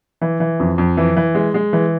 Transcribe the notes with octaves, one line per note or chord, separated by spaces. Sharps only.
E3
E3
F2
F2
E3
E3
G#3
G#3
E3